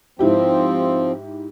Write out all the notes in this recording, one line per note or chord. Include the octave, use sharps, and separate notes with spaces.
G#2 F3 C4 E4 G4